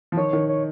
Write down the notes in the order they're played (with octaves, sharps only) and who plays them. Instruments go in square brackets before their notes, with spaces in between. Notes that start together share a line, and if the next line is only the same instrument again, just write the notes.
[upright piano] F3
[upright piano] D#3 [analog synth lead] C#5
[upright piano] D#3
[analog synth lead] C#5